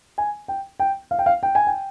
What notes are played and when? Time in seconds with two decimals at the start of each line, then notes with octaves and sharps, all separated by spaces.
0.18 G#5
0.48 G5
0.80 G5
1.11 F5
1.19 G5
1.26 F5
1.43 G5
1.55 G#5
1.67 G5